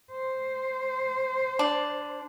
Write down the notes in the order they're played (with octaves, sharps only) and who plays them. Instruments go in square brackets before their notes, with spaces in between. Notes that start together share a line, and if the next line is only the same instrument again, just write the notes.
[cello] C5
[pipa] D4